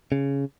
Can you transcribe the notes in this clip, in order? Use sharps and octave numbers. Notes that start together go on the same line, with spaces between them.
C#3